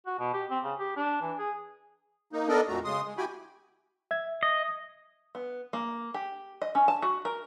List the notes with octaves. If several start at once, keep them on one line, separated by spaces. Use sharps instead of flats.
F#4
B2
G4
C4
C#3
G4
D4
E3
G#4
A#3 D#4
B3 D4 A4 A#4 D5 D#5
F2 A#2 A3 F#4 A#5
C#3 G#3 C6 D#6
G#3
E4 F#4 G4 G5 G#5 B5
E5 G#6
D#5
B3
A#3
G4
D#5
C#4
A5
F#4
A#4